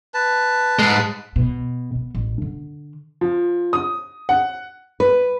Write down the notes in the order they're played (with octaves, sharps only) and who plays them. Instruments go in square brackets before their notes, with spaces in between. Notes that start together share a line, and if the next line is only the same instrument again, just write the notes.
[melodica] B4 A5
[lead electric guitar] G#2 G#3
[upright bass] B2
B3
A1
D3
[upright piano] F3
D#6
F#5
[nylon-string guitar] B4